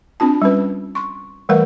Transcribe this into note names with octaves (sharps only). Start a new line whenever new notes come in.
C4 D4 F4 A5
G3 C#4 B4
C6 C#6
E3 G3 A3 A#4 B4 F#5